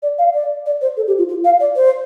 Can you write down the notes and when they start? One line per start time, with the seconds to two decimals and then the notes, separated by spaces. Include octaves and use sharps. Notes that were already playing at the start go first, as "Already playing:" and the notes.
0.03 D5
0.18 F5
0.34 D5
0.66 D5
0.81 C5
0.97 A4
1.07 G4
1.18 F4
1.29 F4
1.45 F5
1.60 D5
1.76 C5